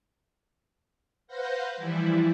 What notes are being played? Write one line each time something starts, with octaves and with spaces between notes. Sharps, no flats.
B4 C5 F5 F#5 G6 A#6
E3 F3 G3 E4